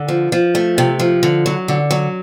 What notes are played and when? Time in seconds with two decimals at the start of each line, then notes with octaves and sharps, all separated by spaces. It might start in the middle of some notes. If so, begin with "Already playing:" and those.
Already playing: D3
0.08 F3
0.32 F3
0.55 A3
0.78 C3
1.00 F3
1.23 D3
1.46 F#3
1.68 D3
1.91 F#3